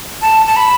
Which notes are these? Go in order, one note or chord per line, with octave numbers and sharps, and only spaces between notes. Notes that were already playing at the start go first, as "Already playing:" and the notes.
A5
A5
B5